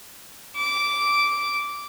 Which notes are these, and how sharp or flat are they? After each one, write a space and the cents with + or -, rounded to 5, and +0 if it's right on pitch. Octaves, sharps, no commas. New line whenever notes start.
D6 -10